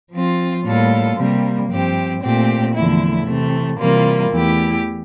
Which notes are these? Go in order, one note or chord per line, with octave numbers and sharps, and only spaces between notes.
F3 C4 F4
A2 G3 A#3 F4 A4
C3 G3 A#3
G2 F3 C4 G4
A#2 A3 C4 G4
E2 D3 F3 A3 E4
C3 E3 A3
C3 E3 G3 A#3 F4
E2 E3 A3 E4 G4